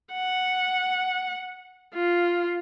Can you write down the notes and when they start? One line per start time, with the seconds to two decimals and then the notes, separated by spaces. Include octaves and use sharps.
0.13 F#5
1.94 F4